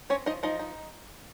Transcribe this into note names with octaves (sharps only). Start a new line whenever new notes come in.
C4 C#4 C#5
F3 D#4 D#5
F3 D#4 D#5
D#4